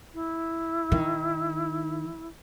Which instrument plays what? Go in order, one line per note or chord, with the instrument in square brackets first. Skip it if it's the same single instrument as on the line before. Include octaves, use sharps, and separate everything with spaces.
[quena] E4
[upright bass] D#3